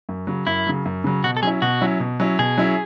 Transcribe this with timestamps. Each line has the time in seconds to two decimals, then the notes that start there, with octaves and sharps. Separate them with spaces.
0.09 F#2
0.27 C#3 F#3
0.47 F#2 E4
0.67 C#3 F#3
0.85 F#2
1.04 C#3 F#3
1.24 B2 F#4
1.37 A4
1.42 F#3 C#4 E4 G#4
1.62 B2 F#4
1.81 F#3 C#4 E4
2.00 B2
2.20 F#3 C#4 E4
2.39 B2 G#4
2.57 F#3 C#4 E4